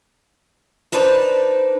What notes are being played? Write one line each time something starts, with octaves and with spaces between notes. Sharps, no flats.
D4 D#4 B4 C5 D5